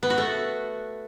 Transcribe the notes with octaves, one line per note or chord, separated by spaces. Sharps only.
B3
F#4
A3